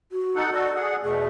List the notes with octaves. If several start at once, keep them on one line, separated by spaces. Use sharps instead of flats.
F#4
D#4 A4 F#5
F#4 A4 D5
G#4 F#5
E2 B2 A3 G#4